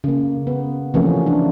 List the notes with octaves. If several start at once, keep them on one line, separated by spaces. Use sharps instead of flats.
C#3 A#3
B3
C3 E3 F3 A3 A#3 C#4
D4